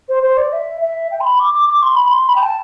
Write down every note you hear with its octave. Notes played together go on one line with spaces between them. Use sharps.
C5
C5
D5
E5
E5
G5
C6
B5
D6
D6
D6
C6
B5
C6
B5
G5
A5